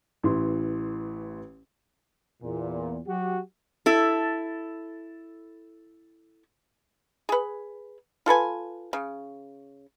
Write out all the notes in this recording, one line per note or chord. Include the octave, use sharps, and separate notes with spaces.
A1 E3 E4 C6
E2 A#2
F#3 F#4 G4
E4 A4
G#4 B4
F4 A4 B4 G#5
C#3